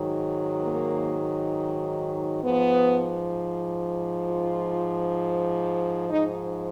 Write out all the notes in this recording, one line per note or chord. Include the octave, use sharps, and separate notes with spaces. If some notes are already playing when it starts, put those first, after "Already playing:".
Already playing: G#2 D#3 F#3
A#3
G#2 F3 B3
F4
G#2 F3 D#4